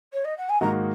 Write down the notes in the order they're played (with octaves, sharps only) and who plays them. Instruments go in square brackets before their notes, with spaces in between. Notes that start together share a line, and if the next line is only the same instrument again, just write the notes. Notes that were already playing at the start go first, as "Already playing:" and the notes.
[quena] C#5
D#5
F#5
G#5
[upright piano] G#2 D#3 A#3 F#4 D#5 [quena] A#5